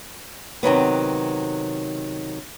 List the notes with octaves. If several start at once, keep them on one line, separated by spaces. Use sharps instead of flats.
C3 D#3 F#3 B3